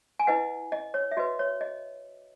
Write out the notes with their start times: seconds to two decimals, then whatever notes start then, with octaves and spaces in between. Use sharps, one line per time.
0.19 G#5
0.27 E4 B4 D#5 F#5
0.72 D#5
0.94 C#5
1.11 E5
1.17 F#4 B4 D#5
1.39 C#5
1.61 D#5